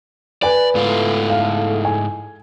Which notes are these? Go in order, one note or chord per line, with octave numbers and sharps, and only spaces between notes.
B4 D5 G#5
G#2 A3 E4 F4 A4
F5
G#5